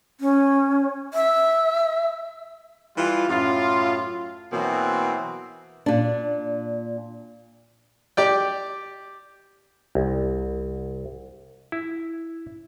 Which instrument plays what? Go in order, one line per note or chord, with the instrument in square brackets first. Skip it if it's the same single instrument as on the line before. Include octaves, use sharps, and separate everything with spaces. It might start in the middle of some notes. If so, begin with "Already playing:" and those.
[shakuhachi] C#4
E5
[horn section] E3 G3 F4
F#2 A2 F4
B2 E3 F#3 A#3 C4
[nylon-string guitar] A#2 D4
[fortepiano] G4 D5 G5
[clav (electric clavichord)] C2
E4